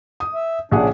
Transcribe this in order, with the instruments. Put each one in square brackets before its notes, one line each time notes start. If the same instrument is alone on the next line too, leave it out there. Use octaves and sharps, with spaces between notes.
[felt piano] D#6
[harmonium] E5
[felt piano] A#1 G#4 F#5 [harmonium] C#3 D4